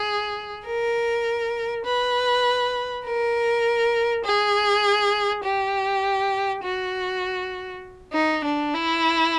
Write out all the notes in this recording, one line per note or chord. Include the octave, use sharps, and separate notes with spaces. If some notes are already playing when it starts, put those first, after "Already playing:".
Already playing: G#4
A#4
B4
A#4
G#4
G4
F#4
D#4
D4
E4